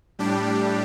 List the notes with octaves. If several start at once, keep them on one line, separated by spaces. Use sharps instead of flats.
A2 G3 D4 G4